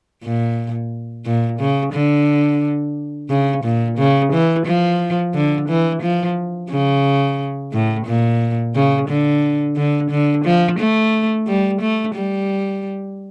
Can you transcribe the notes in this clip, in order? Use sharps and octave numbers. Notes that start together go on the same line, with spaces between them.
A#2
A#2
C#3
D3
C#3
A#2
C#3
E3
F3
D3
E3
F3
C#3
A2
A#2
C#3
D3
D3
D3
F3
A3
G3
A3
G3